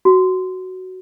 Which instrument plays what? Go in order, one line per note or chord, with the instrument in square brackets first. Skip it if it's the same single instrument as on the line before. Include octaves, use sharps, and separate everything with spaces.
[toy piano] F#4